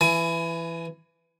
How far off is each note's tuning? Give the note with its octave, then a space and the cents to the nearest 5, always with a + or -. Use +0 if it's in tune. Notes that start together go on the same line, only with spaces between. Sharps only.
E3 +15 G#5 +25